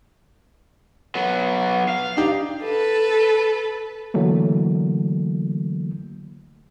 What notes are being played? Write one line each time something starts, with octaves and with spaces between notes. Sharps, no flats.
F#3 B3
F5
D4 D#4 G4
A4 B4
D3 E3 F#3 A3 A#3